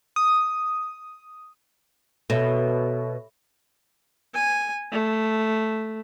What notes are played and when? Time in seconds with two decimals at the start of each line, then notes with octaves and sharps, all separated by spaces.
0.16 D#6
2.30 B2 A4 C#5 E5
4.34 G#5
4.92 A3